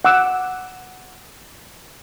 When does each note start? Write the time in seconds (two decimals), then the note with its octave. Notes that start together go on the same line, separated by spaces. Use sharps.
0.05 F#5 D6 E6